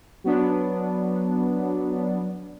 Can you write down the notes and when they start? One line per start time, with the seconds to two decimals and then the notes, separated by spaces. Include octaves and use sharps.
0.24 F#3 B3 D4